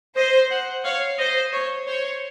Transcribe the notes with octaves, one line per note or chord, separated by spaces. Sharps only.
C5 D#5
F#5
C#5 F5
C5 D#5
C#5
C5 C#5